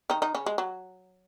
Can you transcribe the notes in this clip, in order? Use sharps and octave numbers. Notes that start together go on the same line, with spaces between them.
D#3 D#4
D#3 D#4
C#3 C#4
G#3
F#3